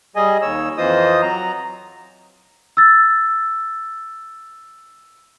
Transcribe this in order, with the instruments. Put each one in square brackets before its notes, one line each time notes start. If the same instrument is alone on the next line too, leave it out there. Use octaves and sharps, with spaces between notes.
[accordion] G3 G#4 D#5 G#5
D#2 C#5 E6
F2 E3 F4 C5 D#5 D#6
F#3 A#5
[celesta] E6 A6